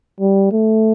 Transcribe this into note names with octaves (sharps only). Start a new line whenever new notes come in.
G3
A3